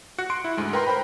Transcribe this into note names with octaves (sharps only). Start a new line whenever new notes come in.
F#4 F#6 C#7
C6 C#7 D7
E4
D2 G#2 G#3
A#4 B4 G5 A#5 C6
A#4 C5 G5 B5